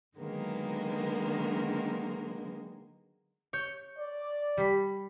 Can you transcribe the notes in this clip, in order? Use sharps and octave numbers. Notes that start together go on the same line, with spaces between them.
D3 D#3 F#3 G#3 A#3 B3
C#5 G6
D5
G3 B5